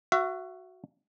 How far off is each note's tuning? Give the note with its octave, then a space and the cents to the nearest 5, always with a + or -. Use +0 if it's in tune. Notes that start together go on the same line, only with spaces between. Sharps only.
F#4 +0 E5 +35